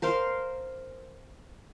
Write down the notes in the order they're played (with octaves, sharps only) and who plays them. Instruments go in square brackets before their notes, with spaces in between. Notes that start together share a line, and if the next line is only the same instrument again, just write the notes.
[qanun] A#4 C5 F5 C6